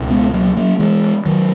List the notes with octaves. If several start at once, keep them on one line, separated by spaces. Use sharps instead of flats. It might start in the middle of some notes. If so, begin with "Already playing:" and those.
Already playing: C#2 B2
G#3 B3
F#3 A#3
F#3 A#3
E3 G#3
D#3 F#3